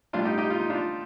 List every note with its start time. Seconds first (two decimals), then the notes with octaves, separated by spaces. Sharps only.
0.13 A2 G3 D4 F4
0.25 D#4 G4
0.38 D#4 G4
0.50 F4
0.60 D#4
0.70 D4 F4